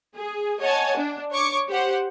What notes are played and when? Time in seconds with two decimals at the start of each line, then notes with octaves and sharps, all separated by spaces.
0.15 G#4
0.60 C#5 D#5 F#5 G#5 A5
0.97 D4
1.33 C#5 C#6 D6
1.68 G4 C5 F#5